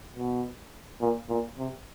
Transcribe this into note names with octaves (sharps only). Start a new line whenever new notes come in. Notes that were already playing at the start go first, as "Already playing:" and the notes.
B2
A#2
A#2
C3